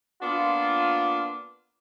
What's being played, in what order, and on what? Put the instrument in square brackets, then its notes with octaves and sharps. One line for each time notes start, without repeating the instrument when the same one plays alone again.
[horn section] A#3 B3 D4 F4